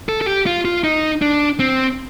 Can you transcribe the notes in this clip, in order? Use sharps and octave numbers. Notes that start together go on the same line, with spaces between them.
A4
A4
G4
F4
F4
D#4
D4
C4